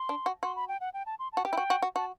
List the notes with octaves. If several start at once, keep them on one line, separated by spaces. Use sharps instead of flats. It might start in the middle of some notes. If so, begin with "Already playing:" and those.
Already playing: C6
D4
F#4
F#4 C6
B5
G5
F#5
G5
A5
C6
A5
F#4
G4 G5
E4
F#4
F#4
F#4
F#4 A5